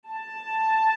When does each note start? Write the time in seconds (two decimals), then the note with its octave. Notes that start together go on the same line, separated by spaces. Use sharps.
0.09 A5